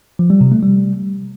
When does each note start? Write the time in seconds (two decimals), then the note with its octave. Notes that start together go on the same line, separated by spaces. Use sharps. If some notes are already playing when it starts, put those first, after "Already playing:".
0.19 F3
0.30 G3
0.41 C3
0.52 A3
0.62 G3